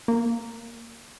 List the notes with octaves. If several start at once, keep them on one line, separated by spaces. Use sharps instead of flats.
A#3